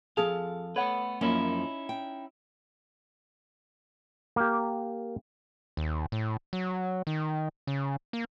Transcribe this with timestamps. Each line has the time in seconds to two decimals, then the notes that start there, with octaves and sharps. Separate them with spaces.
0.17 F2 F3 G#4 A4 F5 A5
0.76 A3 B3 B4 C#5 F#5
1.21 F#2 F3 A#3 C#4 D#4 E4
1.89 G5
4.36 A#3 G4
5.77 D#2
6.12 A2
6.53 F#3
7.07 D#3
7.67 C#3
8.13 A#3